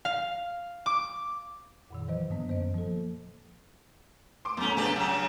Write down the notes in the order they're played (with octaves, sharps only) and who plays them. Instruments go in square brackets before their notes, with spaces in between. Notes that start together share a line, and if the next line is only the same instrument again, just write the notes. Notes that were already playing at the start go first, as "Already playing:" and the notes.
[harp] F5
D6
[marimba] F2 A#2 D#3
[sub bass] E3 [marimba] F#3 C5 D#5
[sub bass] G2 [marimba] D3 A#3 B3
[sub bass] F#2 [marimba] C5 D#5
[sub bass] F3 [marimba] A#3 A4
[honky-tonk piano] C6 D6 D7
[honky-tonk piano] E2 A2 [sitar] F#3 C#4
[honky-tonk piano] C#2 G#4 A#5 [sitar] D4 G4 B4
[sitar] C#3 F#3